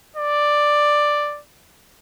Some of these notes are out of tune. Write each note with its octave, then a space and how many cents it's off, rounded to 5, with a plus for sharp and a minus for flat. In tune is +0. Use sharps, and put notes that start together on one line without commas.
D5 +5